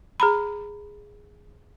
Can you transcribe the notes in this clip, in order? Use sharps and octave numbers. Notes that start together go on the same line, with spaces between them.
G#4 A#5 B5